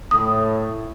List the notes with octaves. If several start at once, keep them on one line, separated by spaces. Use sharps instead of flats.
A2 D#6